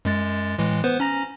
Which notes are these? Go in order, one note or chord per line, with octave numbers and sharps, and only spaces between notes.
F#2 G#3 A6
A2 E3 G#3
B3 B4 C5
C#4 A#5 A#6